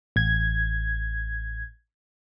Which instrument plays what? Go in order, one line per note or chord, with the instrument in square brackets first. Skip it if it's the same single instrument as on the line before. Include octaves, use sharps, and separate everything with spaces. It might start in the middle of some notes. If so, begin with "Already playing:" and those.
[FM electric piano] A1 G#6